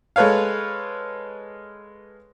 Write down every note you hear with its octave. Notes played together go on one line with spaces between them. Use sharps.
G#3 A4 B4 C#5 F5